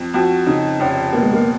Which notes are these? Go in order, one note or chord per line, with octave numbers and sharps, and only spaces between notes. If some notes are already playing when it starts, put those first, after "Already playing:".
Already playing: F2
F2 F#4
C#3 D#4
F1 C#4
B2 A#3
G#3
A#3